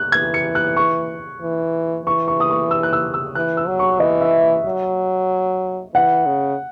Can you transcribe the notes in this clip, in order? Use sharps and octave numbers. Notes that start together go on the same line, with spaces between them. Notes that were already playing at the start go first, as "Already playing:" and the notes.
Already playing: F#6
E3 G#6
C#7
F#6
C#6
E3
E3 C#6
C#6
D#6
C#6
E6
F#6
E6
E6
E3 F#6
E6
F#3
C#6
E3 D#5
E5
F#3
E3 F#5
C#3